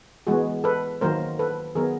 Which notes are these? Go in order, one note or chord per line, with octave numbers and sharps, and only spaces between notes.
E3 G#3 B3 F#4 G#4
A4 B4
D#3 F#3 A#3 A#4 C5
A4 B4
D#3 F#3 B3 G#4 A#4